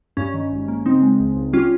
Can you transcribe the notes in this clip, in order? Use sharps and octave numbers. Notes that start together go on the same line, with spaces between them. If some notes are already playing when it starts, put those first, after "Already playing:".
G2 C#4
D#3
G#1
A#3
C#3 C4 D#4
G#3
C#2
C#2
G3 C#4 F4